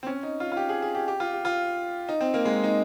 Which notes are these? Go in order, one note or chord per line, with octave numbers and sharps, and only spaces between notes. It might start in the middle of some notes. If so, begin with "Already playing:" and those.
C4
C#4
D#4
F4
F4
G4
G#4
G#4
G4
G4
F4
G4
F4
D#4
C4
A#3
G#3
D#4